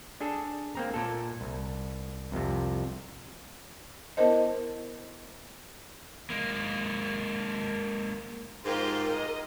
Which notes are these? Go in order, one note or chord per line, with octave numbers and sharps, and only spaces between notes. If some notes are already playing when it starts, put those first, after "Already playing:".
D4 G#4 A4
A#3 C4 A#5
A#2 A4
C2
C2 F2 C3
B3 E4 A#4 C5 D#5
G#3 A#3
G#2 F4 G4 A#4 C5
D#5